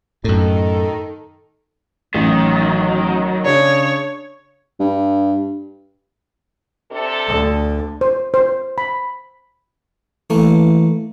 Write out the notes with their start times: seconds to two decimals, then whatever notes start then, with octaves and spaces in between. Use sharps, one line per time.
0.24 F#2 A2 D#3 D#4 A4
2.15 A1 D#3 F#3
3.45 C#3 D4 C#5
4.80 G2
6.91 C3 D4 A4
7.27 D2 D3
8.01 C5
8.34 C5
8.78 B5
10.30 E3 A3 A#3